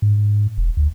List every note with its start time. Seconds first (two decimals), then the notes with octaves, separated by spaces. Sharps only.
0.02 G#2
0.58 E1
0.77 D2